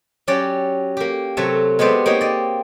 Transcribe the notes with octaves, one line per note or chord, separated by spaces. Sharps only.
F#3 C#4 G4 D5
A#3 G4
C3 F#3 A3 A4 C#5 E5
G#3 B3 G4 C5 D5 E5
A#3 C4 D#4 G4 C#5 D#5
D5 D#5